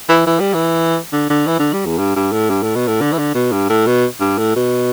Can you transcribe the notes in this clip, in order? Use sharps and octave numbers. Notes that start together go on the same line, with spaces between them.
E3
E3
G3
E3
D3
D3
E3
D3
G3
E2
G2
G2
A2
G2
A2
B2
A2
D3
E3
D3
B2
G2
A2
B2
G2
A2
B2